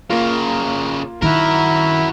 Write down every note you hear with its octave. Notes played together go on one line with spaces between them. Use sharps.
C#3 A#3 F4 A#4
D#3 E4 F#4 A#4